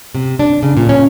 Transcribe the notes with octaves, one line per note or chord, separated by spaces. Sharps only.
C3
D4
C#3
A#2
C#4